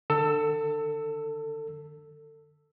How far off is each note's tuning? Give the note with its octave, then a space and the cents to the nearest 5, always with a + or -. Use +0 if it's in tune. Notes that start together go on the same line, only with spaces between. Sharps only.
D3 +25 A4 +25 E6 +0